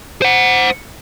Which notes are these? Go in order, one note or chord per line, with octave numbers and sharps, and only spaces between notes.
C5 F#5